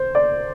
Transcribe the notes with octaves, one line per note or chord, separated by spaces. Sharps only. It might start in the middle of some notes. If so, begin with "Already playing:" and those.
Already playing: C5
D5